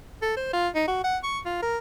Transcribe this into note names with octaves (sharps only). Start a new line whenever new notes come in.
A4
C5
F4
D#4
F#4
F#5
C#6
F4
A#4